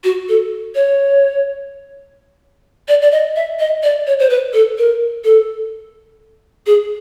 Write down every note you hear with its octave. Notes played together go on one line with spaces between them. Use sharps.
F#4
A4
C#5
D5
D5
D#5
E5
D#5
D5
C#5
C5
B4
A4
A#4
A4
G#4